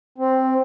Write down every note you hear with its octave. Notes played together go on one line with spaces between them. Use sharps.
C4